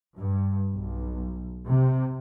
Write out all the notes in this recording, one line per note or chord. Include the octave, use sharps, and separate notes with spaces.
G2
B1
C3